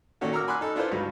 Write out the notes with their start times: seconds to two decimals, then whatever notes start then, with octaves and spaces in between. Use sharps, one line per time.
0.21 A#2 D#3 C#4 F#4 A4
0.32 F#4 A#4 A#5 D6 E6 F6
0.48 G#5 B5 C6 D6 E6 F#6
0.61 D#4 A4
0.75 D4 E4 F4 A4 B4 C5
0.91 C#2 G2 F#3